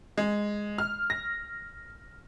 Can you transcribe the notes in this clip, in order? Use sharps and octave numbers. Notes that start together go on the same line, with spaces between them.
G#3
F6
A#6